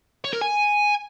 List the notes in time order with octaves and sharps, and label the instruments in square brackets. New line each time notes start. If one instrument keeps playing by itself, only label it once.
[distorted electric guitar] C#5
A#4
G#5